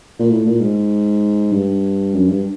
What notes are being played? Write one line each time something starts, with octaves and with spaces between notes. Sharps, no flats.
A#2
A2
A#2
G#2
G2
F#2
G2